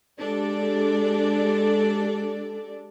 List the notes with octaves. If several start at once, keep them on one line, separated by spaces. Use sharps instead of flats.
G#3 D4 G4 A4 D5